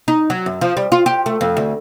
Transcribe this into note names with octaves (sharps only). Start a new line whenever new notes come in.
D#4
F#3
F#2
F3
G3
F4
G4
A3
F2
D2